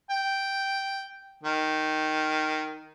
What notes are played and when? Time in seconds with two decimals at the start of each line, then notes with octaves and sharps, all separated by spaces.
0.10 G5
1.43 D#3